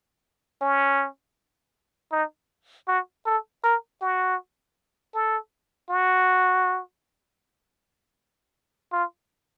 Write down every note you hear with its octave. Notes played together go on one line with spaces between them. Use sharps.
C#4
D#4
F#4
A4
A#4
F#4
A4
F#4
F4